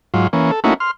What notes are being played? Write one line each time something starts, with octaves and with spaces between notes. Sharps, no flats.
G#2 F#3 F4
E3 A#3 C#4
A4
A3 A#3 C#4 D#4 E4 F#4
C6 F6